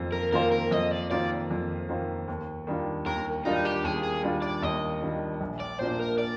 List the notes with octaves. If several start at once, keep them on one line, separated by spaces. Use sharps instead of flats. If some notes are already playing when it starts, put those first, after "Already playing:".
Already playing: F2 D#3 A#3 F4 C5
A#4
D#3 A#3 F4 A#4 C5
A#4
F2 D#5
D5
D#3 A#3 F4 C5 D5
F2
D#3 A#3 F4 C5
D#2
D#3 G3 D4 F4
D#2 A#4
D#3 G3 D4 D#4 F4
G4
D#2 G#4
G#4
D#3 G3 D4 F4
D5
D#2 D#5
D#3 G3 D4 F4
A#1
D5
A#2 F3 A#3 D4 C5
A#4
D5